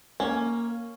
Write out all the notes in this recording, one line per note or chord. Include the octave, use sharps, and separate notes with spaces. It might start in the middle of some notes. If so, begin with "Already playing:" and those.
A#3 C#4